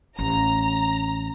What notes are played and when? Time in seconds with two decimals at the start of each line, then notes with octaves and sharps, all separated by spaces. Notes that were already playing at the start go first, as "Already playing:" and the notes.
0.19 A1 A#5